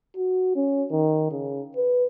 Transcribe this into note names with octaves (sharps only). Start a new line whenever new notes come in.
F#4
C#4
D#3
C#3
B4